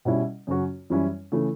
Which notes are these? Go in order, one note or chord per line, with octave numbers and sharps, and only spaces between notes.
B2 G3 C#4 E4
F#2 C#3 F#3 C#4 F#4
F#2 E3 G3 C#4 E4
C#3 E3 A3